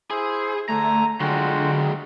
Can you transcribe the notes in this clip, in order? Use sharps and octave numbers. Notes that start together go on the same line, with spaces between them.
E4 G#4 C5
D3 A3 G#5 A#5
D3 F#3 G#3 F4 F#4 G5